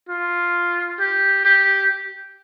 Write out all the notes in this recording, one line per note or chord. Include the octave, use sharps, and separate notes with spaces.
F4
G4
G4